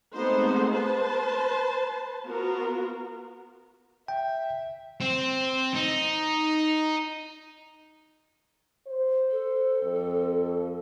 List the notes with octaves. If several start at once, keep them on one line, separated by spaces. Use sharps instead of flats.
G#3 A3 B3 C4 D#4 C5
B4 C5 A5
B3 F4 F#4 A#4
E5 G5
C4
D#4
C5
A4
F2